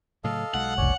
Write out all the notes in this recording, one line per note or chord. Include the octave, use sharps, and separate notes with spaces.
A2 C#3 F#3 A4 D#5 F5
B1 G#3 F#5
F#1 C2 C#4 C#5 D5